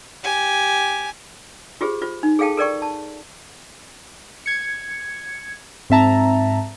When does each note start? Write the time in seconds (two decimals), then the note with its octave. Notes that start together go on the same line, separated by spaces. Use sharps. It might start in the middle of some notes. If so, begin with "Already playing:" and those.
0.24 G4 G#5
1.81 F4 G4 G#4 C5
2.01 F4 C5
2.23 D#4
2.39 G#4 A4 F5 G5 A5
2.58 A4 A#4 D5 G5 C#6
2.82 A5
4.46 G#6 C#7
5.90 G#2 C4 E5 A5 A#5